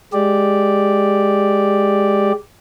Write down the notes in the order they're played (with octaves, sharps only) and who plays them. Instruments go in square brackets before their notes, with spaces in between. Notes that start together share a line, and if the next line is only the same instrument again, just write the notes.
[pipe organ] G#3 G4 D5